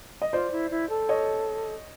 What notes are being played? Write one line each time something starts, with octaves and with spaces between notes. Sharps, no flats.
D#5
F4 C5 D5
E4
E4
A4
C#5 D#5